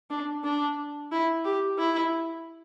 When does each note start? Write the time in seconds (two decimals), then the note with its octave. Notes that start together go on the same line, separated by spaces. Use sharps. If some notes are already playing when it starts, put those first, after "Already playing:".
0.10 D4
0.44 D4
1.11 E4
1.45 G4
1.78 E4